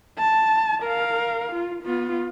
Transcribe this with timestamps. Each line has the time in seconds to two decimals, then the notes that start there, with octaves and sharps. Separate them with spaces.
0.18 A5
0.83 A#4 F5
1.53 F4
1.83 B3 F4